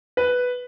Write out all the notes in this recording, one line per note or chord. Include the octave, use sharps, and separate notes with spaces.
B4